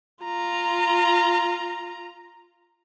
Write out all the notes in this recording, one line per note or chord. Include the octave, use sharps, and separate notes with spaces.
F4 A#5